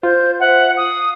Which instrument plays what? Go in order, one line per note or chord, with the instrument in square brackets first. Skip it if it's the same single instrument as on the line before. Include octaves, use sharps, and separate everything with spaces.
[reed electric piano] F4 [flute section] C5 G6
[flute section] C5 E5 [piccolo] F#5
[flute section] F5 [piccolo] D#6